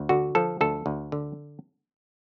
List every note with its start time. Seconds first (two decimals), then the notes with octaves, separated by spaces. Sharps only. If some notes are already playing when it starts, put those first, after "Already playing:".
Already playing: D2
0.09 D3 F#4
0.35 F3 A4
0.61 D2 A4
0.86 D2
1.12 D3